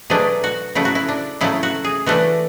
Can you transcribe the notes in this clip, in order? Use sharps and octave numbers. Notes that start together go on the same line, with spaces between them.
B2 F#3 A3 D4 G#4
F#4
C#3 F#3 A3 E4
F#4
E4
D4
C#3 F#3 A3 E4
F#4
G#4
E3 A3 D4 F#4